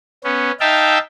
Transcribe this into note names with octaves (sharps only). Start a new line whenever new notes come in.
B3 C#4
D#4 E5 F5 G5 A5